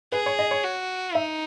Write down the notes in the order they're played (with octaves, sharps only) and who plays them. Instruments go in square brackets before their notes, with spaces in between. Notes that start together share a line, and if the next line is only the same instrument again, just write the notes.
[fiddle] G#4 [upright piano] B4
[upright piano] C#5
D#5
C#5
[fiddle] F#4
[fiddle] D#4 [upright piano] E5